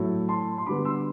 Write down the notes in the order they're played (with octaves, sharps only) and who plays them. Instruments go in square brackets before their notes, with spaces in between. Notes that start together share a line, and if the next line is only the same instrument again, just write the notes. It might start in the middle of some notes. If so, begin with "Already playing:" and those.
Already playing: [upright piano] A2 F#3 A3
A5 C6
C6
D3 G3 B3 B5 D6
C6 E6